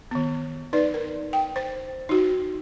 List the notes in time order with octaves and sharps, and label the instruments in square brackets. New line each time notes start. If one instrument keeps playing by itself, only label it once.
[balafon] D#3 B3
D#4 B4 D5
A#4
G5
C5
D#4 F#4